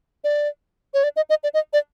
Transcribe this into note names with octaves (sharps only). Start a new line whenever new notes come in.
D5
C#5
D5
D#5
D#5
D5
D#5
D5